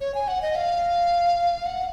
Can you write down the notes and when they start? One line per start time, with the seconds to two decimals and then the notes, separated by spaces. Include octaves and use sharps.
0.01 C#5
0.14 G#5
0.28 F#5
0.42 D#5
0.55 F5
1.66 F#5